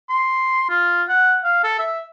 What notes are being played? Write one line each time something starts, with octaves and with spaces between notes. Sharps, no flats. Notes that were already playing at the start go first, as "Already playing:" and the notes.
C6
F4
F#5
F5
A4
E5